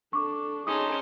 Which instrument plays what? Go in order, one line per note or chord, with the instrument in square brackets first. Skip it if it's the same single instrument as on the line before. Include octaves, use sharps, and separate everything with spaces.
[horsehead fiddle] D4 A4 [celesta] C#6 D6
[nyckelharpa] C#4 C6 [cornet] D#4 [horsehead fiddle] G#4 A5 [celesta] D#6